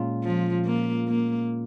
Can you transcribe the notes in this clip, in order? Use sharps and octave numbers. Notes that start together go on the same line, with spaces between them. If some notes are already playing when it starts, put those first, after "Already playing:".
Already playing: A#2 G#3 C#4 F4
F3
A#3
A#3